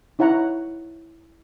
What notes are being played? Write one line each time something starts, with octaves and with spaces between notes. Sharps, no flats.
D#4 E4 C#5 F#5 A#5